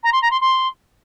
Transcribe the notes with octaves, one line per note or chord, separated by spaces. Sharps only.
A#5
C6
A#5
C6
C6